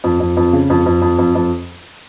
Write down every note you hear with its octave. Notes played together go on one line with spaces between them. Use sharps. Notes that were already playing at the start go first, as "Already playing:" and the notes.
F2
F2
F2
C#3
F2
F2
F2
F2
F2